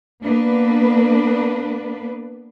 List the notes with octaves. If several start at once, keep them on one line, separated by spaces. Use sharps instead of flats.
A#3 B3 D4 B4